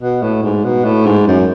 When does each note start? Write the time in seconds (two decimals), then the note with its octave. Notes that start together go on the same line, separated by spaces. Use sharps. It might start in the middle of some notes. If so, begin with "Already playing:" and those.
0.02 B2
0.22 A2
0.43 G#2
0.64 B2
0.85 A2
1.06 G#2
1.27 F#2